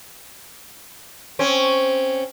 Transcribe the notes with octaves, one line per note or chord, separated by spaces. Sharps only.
C4 C#4